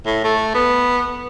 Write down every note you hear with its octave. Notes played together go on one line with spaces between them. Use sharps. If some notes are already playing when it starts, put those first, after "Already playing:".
A2
A3
B3